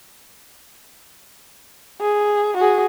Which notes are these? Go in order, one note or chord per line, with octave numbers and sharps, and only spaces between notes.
G#4
F#4 G#4